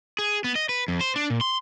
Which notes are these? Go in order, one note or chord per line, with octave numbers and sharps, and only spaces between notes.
G#4
B3
D#5
B4
F2
C5
D4
A#2
C6